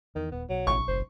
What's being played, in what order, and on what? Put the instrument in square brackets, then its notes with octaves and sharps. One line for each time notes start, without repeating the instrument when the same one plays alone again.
[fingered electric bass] E2 [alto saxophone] D#3
[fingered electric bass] D#1 [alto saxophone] B3
[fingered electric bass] B1 [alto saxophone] F#3
[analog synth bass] A1 [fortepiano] C#6
[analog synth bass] F#1 [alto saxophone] C5